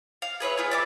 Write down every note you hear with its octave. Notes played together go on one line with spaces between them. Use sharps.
F5
G#4 B4 C#5 E5
B3 F4 G#4
D5 E5 D6